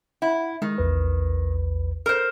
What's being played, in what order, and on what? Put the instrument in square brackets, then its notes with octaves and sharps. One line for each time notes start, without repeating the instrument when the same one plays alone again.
[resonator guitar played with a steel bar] E4 [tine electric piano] F#5
[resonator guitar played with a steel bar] D#3 [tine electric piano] G#3
[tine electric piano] A#1 E2 B4
[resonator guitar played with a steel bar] A#4 C5